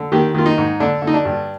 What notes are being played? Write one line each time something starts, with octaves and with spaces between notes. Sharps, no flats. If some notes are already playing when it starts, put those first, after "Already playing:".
Already playing: D3
D#3 G4
D#3 F4
D#4
G#2
D3 D4
D3
D#4
D4
G2